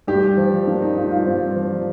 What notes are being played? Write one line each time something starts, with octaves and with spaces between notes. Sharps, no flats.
G2 G4
F3
A#3 D4
D#4
G2 F4
F4
G2 C4
F3